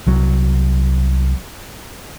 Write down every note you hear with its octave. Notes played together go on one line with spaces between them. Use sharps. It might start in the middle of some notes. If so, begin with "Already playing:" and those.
C2 F#3